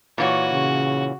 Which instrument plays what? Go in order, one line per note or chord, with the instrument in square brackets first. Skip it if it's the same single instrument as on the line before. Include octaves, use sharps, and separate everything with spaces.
[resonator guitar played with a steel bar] A#2 E3 C#5 [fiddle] F#4
[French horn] C#3